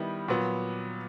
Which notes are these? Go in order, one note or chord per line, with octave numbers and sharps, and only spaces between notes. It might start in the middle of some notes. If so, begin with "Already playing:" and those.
Already playing: D#3 G3 B3 E4
A#2 F#3 B3